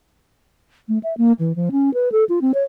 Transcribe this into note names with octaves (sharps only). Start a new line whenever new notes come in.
A3
E5
A#3
E3
F3
C#4
B4
A4
F4
C4
C#5